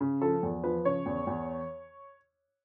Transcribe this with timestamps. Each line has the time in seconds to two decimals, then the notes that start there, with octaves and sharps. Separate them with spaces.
0.01 C#3
0.22 F3 A4
0.43 E2
0.63 F3 B4
0.85 C#3 C#5
1.06 E2
1.27 E2